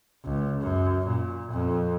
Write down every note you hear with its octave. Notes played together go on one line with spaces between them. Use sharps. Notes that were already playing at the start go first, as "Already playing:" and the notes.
C#2
F#2
A#2
F2